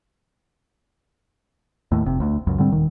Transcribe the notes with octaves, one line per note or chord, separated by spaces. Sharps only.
D#2 A2
F1 C3
D2
C#2 F#2
G#2 D3 G3 C4
D#1 D#3